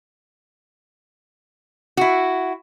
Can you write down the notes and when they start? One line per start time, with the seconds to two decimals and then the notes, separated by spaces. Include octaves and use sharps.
1.97 E4 F#4